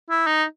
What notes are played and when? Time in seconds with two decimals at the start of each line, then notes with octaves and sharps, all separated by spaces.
0.10 E4
0.27 D#4